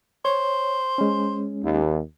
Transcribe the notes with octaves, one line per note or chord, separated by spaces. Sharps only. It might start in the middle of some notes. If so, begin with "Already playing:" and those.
C5 C#5
G#3 C#4
D#2